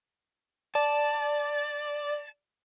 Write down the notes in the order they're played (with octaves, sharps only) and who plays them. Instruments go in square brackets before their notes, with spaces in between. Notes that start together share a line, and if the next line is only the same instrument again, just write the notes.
[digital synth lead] D5 [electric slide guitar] A5